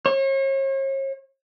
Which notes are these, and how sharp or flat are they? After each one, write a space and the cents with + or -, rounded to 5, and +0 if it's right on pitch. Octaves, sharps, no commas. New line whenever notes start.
C#5 -40